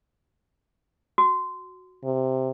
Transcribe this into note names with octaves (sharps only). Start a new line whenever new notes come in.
F#4
C3